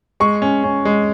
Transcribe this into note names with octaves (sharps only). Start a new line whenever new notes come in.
G#3 C#6
C#4
C#4
G#3